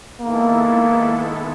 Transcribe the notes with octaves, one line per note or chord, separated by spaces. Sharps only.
D#3 G#3 A#3 B3 E4 A4